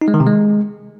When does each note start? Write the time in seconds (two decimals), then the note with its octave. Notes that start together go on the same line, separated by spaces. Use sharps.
0.01 D#4
0.08 G#3
0.14 D#3
0.20 C3
0.26 G#3